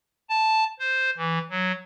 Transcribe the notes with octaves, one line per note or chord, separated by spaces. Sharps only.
A5
C5
E3
F#3